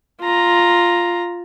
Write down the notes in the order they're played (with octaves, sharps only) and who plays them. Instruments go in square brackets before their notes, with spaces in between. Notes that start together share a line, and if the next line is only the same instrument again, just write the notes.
[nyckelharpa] F4 A#5